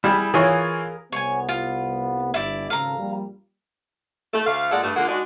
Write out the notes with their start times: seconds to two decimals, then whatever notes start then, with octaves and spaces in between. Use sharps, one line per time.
0.04 G3 E4 G#4
0.34 E3 F4 G#4 A#4 C#5
1.12 C2 B3 C#5 G#5
1.49 F4
2.34 G1 E4 D5
2.70 G#1 C#3 A4 F5 A#5
2.99 A#1 G3
4.34 A3
4.47 D2 A3 F5
4.71 A#2 G#3 A4 D5 F#5
4.83 G2 A3
4.96 D3 G#3 A#3 F4 F#5
5.09 G#3 D4 D#4 F#4